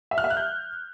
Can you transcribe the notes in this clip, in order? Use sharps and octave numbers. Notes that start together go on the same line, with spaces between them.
E5
F6
E5
F#6
G6